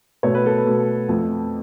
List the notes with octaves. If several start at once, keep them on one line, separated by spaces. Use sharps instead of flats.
B2 A3 C#5
B4
A4
B4
B2 A3
F2 F3 A3